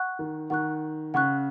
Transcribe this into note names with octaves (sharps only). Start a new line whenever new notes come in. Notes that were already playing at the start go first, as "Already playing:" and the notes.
Already playing: F#5 C#6 F#6
D#3
D#3 F#5 C#6 F#6
C#3 F#5 C#6 F#6